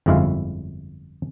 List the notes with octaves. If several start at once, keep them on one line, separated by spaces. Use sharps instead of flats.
G1 F2 G#3 E4 F#4 F5